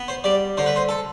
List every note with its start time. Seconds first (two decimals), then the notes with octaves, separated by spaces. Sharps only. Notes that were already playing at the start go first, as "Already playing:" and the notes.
Already playing: B3
0.08 C5
0.24 G3 D5
0.57 D3 C5
0.66 B4
0.76 C5
0.89 A4